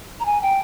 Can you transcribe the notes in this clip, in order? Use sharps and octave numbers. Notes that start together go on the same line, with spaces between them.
A#5
G#5
G5